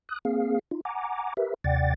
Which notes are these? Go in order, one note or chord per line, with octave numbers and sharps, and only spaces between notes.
D#6 F#6
A#3 C4 G#4 F5
D#4 F4
F#5 G#5 A#5 D6
G4 A#4 B4 E5
D#2 C3 D5 F#5 G5 A6